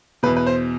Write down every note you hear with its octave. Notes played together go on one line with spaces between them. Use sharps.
E2 B2 B4
B4
C5